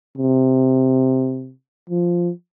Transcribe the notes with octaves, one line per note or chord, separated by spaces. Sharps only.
C3
F3